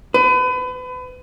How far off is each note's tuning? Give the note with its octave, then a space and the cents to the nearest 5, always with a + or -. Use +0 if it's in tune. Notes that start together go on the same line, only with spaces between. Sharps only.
B4 +35